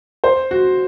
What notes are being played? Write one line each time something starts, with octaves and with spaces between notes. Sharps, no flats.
C5
F#4